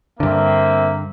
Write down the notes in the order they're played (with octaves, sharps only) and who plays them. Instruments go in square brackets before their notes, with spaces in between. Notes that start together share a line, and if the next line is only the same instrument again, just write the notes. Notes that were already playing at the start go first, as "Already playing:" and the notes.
[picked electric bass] G2 D3 [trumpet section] A#3 C4 E5